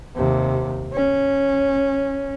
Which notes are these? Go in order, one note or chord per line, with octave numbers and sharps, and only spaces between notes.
D#2 C3
C#4